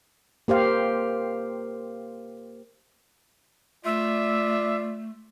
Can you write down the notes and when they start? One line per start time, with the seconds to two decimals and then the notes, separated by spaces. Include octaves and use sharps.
0.48 A#3 G4 C5 F5
3.85 A3 F4 D5 E5